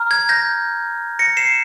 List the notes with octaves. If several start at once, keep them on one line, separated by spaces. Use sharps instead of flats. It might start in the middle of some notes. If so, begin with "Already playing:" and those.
Already playing: A#5 F6
G#6
G6 A#6
A#6 C#7
C7 E7